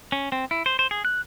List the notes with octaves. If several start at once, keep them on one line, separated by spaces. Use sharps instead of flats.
C#4
C4
E4
C5
C5
G#4
F#6